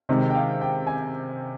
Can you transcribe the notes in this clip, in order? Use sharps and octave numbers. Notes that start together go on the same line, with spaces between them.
C3 D#3 G#3
G5
F5
G5
G#5